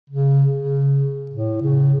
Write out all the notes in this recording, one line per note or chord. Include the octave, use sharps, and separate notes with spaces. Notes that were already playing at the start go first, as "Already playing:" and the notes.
C#3
C#3
A2
C#3